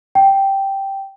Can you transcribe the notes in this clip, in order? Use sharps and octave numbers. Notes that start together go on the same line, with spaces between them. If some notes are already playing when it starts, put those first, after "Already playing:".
G5